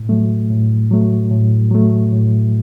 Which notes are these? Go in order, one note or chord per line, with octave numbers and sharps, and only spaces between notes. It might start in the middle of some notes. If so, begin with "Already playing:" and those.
Already playing: A2
F#3 A3
A2
F#3 A3
A2
F#3 A3
A2